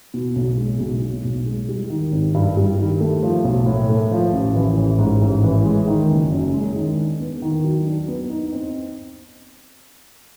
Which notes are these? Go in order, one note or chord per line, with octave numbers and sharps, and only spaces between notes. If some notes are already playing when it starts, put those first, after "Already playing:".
B2
B1
G#3
B1
B2
B1
G#3
G3
D#3
G#1
G2
G3
D#3
A3
F3
B1
A2
A3
F3
A1
E3
A1
G#2
A1
E3
G#3
D#3
F#1
F#2
G#3
D#3
D4
B3
D#3
F#3
D4
B3
D#4
C4